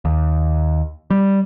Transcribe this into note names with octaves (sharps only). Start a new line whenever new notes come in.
D#2
G3